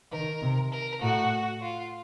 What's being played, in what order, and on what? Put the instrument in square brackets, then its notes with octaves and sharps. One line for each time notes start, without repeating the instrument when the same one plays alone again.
[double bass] D#3 [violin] A#4
[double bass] C3
[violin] A#4
[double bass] A2 [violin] F#4
[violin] F4